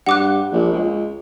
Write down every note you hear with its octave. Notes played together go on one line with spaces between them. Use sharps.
G2 F#5 D6 F#6
A#1
C#2